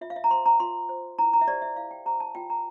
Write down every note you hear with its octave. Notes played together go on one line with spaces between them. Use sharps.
F4 E5
F5
E5
A#5
C5 C6
A#5
F4 C6
C5
E4 A#5
A#5
E5
G4 C5 D5
E5
E4 F5
G5
G4 C5 A#5
A5
F4 G5
A#5